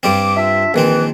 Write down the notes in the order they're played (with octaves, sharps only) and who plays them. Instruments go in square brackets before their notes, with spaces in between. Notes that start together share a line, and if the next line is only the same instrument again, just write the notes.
[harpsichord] G2 G3 C4 [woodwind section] D6
[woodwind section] D4 F4 E5
[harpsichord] A#1 D#3 C4 [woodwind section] E3